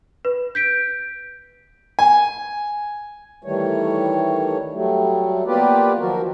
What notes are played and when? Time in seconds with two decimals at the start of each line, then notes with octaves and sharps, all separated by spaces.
0.25 B4
0.55 G6 B6 D7
1.99 G#5
3.43 D#3 E3 G3 A3 C#5
4.73 F#3 G3 A3
5.46 A#3 B3 F4 G4 B4 D5
5.98 D#3 F3 F#3 F#4 A#4